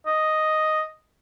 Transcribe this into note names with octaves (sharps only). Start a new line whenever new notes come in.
D#5